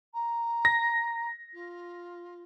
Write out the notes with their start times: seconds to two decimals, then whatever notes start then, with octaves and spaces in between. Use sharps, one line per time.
0.14 A#5
0.65 A#6
1.53 F4